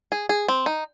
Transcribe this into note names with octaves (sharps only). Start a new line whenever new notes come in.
G#4
G#4
C4
D#4